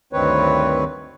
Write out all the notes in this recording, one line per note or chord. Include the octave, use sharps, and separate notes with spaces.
D2 G2 D#3 C4 B4 C#5